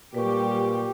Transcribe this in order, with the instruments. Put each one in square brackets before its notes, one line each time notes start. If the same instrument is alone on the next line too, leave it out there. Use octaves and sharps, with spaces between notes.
[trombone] A#2 [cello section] G3 G4 [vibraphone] B4 C#6